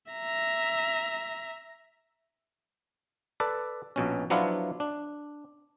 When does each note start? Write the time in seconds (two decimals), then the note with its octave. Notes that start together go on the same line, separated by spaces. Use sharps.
0.12 E5 A#5
3.40 A4 B4 D5
3.96 A#1 B2 C#4
4.30 F3 F#3 B3 D4 E4 F4
4.80 D4